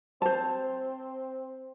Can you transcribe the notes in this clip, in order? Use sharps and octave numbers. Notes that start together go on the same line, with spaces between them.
C4 C5 A5